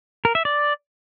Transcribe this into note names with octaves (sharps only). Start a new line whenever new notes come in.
A#4
E5
D5